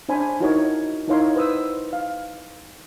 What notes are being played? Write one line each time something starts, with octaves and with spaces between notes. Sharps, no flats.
C#4 D4 C5 G#5 B5
C#4 D#4 E4 F#4 A#4 C#5
D#4 E4 A#4 C#5 F5 C6
B4 C5 D#6 E6
F5